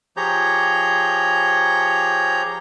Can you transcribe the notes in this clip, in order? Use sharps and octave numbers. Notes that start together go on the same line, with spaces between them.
F3 G4 G#4 C#5 A#5 G6